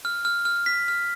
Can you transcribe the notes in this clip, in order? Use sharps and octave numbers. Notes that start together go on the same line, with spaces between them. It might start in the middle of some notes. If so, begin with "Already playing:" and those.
F6
F6
F6
B6
F6